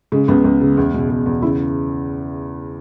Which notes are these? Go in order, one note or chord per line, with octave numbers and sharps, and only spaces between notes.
C#3 G#3
C#2 B3
C#2
C#3
E2
B2
E2
E2
C#3 E4